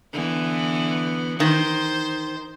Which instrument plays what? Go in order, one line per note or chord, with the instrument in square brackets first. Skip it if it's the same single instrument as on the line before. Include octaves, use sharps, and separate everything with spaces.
[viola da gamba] D3 E3 B3
[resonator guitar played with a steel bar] D#3 [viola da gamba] C5